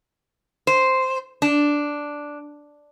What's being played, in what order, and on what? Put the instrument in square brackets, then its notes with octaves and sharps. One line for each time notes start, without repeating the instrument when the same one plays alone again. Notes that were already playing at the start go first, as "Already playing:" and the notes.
[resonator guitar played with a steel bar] C5
D4